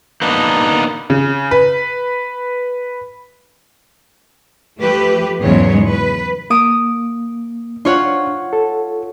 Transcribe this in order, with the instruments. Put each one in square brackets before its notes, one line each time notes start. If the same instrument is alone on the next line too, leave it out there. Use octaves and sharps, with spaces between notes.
[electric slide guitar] A#3 B3 D4 D#4
[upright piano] C#3
B4
[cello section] F3 A3 G4 B4
E2 G#2 C#3 F#3 G#3 C#5
B4
[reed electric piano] A#3 [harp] D#6 D7 D#7
[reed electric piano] D4 [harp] F4 C#5 F#5
[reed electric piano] A4